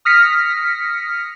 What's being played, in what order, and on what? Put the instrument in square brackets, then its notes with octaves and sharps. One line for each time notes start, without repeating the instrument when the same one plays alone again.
[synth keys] D#6 F6 A#6 B6 C#7